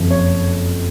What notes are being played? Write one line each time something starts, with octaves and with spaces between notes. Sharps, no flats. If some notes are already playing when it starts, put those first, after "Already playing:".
Already playing: F#1 F2 C3 F3
C#5